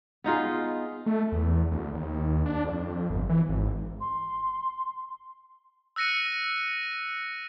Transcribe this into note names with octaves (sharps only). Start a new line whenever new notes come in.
B3 D#4 F4 G#4
A3
E2
D2
D#2
D4
F2
G1
E3
G#1
C6
E6 F#6 A#6 C#7 D#7